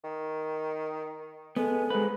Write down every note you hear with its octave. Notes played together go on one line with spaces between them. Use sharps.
D#3
G#3 B3 A4
G#2 G#3 B4